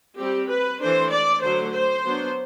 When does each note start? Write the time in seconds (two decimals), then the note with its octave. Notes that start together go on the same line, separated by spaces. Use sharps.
0.18 G3 C4 G4
0.49 B4
0.80 E3 A3 D4 C5
1.11 D5
1.42 D3 F#3 A3 C5
1.73 C5
2.04 F#3 B3 D4